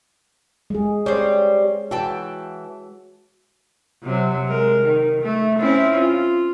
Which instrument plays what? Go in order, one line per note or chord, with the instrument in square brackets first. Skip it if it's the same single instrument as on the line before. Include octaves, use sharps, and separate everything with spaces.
[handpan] G#3 G#4
[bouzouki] G3 C4 [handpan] C#5
[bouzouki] E3 G5 A5 [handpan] F#4
[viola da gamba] C3 F#3
G#3 A#4
D#3
A3
C4 C#4 E4
F4